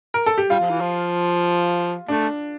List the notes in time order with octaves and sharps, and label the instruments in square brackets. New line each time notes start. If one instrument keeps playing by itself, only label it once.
[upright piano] A#4
A4
G4
[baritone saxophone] G3 [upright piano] F4
[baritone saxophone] F3
E3
F3
[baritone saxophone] A3 [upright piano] D4